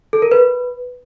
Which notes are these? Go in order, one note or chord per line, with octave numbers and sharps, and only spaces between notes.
A4
A#4
B4